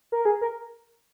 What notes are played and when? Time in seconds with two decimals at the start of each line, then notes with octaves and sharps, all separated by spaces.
0.12 A#4
0.25 G#4
0.42 A#4